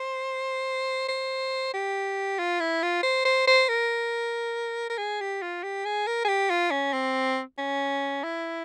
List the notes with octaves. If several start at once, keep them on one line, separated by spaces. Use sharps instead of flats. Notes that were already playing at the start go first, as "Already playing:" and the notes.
Already playing: C5
C5
G4
F4
E4
F4
C5
C5
C5
A#4
A#4
G#4
G4
F4
G4
G#4
A#4
G#4
G4
F4
C#4
C4
C#4
E4